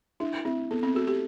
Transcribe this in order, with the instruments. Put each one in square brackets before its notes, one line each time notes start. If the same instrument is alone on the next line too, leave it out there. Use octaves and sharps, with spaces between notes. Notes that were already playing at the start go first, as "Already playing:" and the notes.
[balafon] D4 [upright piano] E4
[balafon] C4 [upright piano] E4
[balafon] B3 [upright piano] A4
[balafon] C4
[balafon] F#4 [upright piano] A4
[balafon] G4